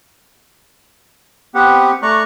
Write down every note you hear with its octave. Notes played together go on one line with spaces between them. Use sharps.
B3 C4 G4 B4 F#5
A3 D5 A#5 C#6 F#6